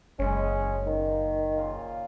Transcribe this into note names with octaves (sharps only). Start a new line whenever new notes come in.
F#1 G#3 C#4
A#2 D#3
A#2 C#3 F4